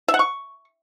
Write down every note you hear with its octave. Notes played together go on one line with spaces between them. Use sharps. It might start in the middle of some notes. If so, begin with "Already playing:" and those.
E5
F#5
C#6